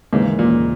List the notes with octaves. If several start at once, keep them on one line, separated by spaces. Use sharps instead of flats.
D#2 G#2 C#3 E3 A#3
A#2